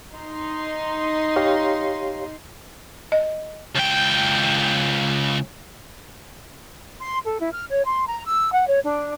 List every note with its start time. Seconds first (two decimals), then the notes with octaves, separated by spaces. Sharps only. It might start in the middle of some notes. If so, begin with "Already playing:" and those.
0.14 D#4 C6
1.36 G4 C#5 F5
3.12 D#5
3.75 C#2 G5
7.01 C6
7.24 A4
7.40 E4
7.52 F6
7.69 C#5
7.85 C6
8.07 A#5
8.25 E6
8.52 F#5
8.68 C#5
8.84 D4